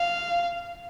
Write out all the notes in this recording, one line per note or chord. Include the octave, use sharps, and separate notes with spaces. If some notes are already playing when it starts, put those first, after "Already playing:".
Already playing: F5